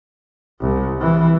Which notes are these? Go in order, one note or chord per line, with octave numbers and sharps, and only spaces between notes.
C2
E3